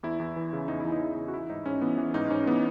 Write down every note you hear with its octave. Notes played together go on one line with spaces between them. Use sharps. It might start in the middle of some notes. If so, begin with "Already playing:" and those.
E2 E4
E2
E3
C#3
E2 D#4
E2 E4
D#4
E3 E4
C#3 D#4
F#4
E3 E4
G#2 D#4
G#2 C#4
E3 B3
E3
G#2 D#4
G#2 C#4
E3 B3